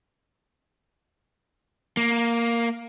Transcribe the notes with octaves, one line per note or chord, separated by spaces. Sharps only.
A#3